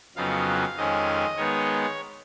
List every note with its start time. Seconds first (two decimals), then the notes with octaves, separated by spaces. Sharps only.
0.16 F2 C#3 F#3 B3 D#4 F5
0.76 F2 D#3 G#3 C#4 D#5
1.37 D#3 G#3 B3 D#4 C#5